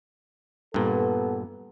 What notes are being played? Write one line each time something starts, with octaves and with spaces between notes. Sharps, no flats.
G2 A#2 B3 A4